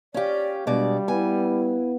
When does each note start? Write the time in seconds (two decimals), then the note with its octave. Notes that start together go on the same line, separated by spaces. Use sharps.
0.14 C#4 G4 D5 F5 C#6
0.67 B2 G3 G#3 D4 D5
1.08 B3 E4 G#5